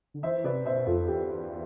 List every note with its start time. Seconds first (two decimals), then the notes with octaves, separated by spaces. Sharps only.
0.14 D3
0.23 E3 C5 E5
0.44 C3 B4 D5
0.65 B2 C5 E5
0.87 F2 F4 A4
1.08 E2 G4